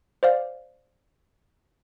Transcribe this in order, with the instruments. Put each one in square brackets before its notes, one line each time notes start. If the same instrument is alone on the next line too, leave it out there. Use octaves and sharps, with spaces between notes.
[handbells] C5 D5 F5